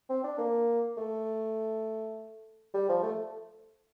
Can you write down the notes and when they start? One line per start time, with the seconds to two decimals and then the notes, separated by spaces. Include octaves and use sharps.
0.10 C4
0.24 D4
0.38 A#3
0.98 A3
2.74 G3
2.89 F3
3.03 A3